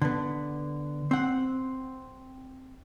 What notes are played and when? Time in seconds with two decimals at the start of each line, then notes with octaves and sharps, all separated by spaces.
0.02 D3 B3
1.11 C4 F#5